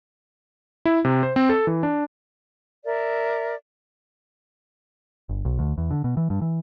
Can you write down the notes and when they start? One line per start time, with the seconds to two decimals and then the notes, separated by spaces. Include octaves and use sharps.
0.85 E4
1.05 C3
1.23 C5
1.36 C4
1.49 A4
1.67 E3
1.83 D4
2.85 A#4 D5 E5
5.29 G1
5.45 B1
5.59 D2
5.78 E2
5.91 D3
6.04 B2
6.17 E3
6.30 G2
6.42 E3